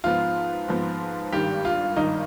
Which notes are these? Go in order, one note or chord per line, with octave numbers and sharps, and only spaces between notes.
G#2 F3 B3 F4
G#2 F3 B3
G#1 G2 D#3 G4
F4
G#1 G2 D#3 D#4